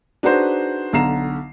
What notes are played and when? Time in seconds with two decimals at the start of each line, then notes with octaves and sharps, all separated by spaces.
0.23 D4 D#4 F#4 G#4 B4 C5
0.93 B1 D3 A#5 C7 E7